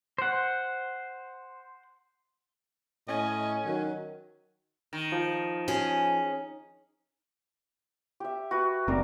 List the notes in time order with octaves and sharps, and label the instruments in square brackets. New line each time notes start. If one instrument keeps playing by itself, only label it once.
[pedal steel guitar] C5 F#5
[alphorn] A2 [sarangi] C#4 [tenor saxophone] D#5
[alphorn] D#3 [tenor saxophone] F#3
[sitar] D#3
[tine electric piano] F3
[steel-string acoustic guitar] C#4 G#4
[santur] G4 E5
F#4 B4
[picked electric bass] F#1 C4 [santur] A#4 D5